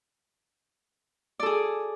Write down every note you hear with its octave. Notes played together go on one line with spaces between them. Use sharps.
G#4 A4 D5